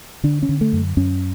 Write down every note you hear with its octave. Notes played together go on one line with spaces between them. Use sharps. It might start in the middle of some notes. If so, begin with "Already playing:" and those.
D3 D4
C#4
D3
A3
F#2
F#2 C#4